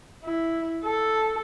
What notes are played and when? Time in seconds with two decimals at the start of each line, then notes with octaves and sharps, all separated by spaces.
0.24 E4
0.84 A4